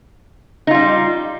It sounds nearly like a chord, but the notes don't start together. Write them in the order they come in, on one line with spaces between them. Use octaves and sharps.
D#4 F4 G3